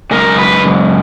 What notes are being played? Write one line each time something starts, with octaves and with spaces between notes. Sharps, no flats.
F#2 C#3 G#3 A#4
B4